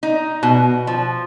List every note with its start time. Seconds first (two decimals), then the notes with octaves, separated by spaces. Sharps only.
0.03 D#4
0.43 B2
0.87 F3